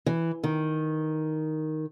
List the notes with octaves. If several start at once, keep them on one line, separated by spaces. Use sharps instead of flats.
E3
D#3